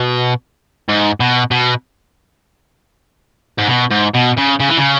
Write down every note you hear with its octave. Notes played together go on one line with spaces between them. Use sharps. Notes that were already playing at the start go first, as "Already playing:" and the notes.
Already playing: B2
G#2
B2
B2
G#2
B2
G#2
B2
C#3
C#3
E3
C#3